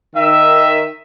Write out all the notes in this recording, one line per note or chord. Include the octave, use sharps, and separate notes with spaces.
D#3 E5